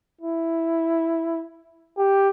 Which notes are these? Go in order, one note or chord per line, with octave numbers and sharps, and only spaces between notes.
E4
G4